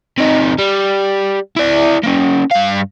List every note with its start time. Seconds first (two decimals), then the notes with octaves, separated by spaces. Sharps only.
0.18 C3 D#4
0.58 G3
1.56 E4 D5
2.03 A#3 C#4
2.51 G2 F5